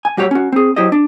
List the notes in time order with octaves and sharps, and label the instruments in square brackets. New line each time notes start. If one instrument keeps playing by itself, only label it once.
[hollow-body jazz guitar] G#5
G3 F#4 G4 C#5
C#4 F#4
C4 G#4
F#3 E4 G4 C5 D#5
D4